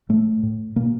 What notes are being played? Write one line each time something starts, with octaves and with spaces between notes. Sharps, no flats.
A2 A3
A2
B2 A#3